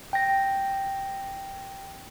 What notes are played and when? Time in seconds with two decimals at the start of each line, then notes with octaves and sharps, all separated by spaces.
0.13 G5 A#6